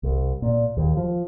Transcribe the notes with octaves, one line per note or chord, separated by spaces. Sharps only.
C2
A#2
D#2
F3